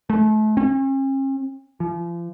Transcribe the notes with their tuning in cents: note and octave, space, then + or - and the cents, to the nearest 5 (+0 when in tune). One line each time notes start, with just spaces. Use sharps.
A3 -35
C#4 -45
F3 -35